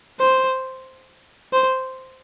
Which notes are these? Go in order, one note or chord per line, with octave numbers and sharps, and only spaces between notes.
C5
C5